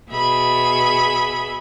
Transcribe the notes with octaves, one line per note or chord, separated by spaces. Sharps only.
B2 G#4 E5 B5